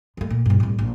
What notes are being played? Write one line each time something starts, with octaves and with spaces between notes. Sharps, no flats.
D3 A3
A#2
G2 B2
C2 A2
A#1